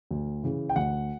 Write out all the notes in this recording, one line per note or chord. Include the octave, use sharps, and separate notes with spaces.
D2
C#3 E3
G5
D2 F#5